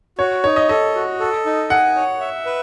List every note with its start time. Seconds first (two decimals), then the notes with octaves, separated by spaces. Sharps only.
0.18 F#4 C#5
0.44 D#4 C#5
0.56 D#5
0.69 A4 D#5
0.95 F#4
1.20 A4
1.46 D#4
1.70 F#5 G#5
1.96 C#5
2.20 E5
2.46 B4